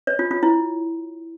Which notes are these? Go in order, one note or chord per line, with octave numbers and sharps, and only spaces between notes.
C#5
F4
F4
E4